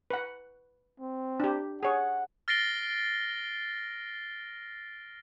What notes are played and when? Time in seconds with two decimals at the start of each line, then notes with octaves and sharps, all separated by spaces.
0.10 B4 F#5
1.00 C4
1.40 D4 G4
1.83 G#4 C#5 F#5
2.48 F6 A6 A#6 C7 D7 G7